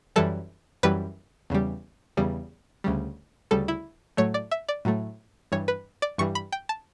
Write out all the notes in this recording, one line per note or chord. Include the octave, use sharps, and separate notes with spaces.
F#2 E3 G3 A4
F#2 E3 G3 B4
E2 C#3 G3
E2 C#3 G3
D2 C#3 G3
D2 C#3 G3 A4
E4
A2 F#3 A3 C#5
D5
E5
D5
A2 F#3 A3
G2 E3 G3 C#5
B4
D5
G2 E3 G3 C#6
B5
G5
A5